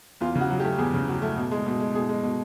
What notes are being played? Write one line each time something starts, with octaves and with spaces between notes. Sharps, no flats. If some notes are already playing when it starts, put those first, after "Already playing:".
E2 F4
C#3 F#4
F#3
G4
A3
E2 G#4
C#3
F#3
A3
B2
G#3
B2
G#3
B2 G#4
G#3
B2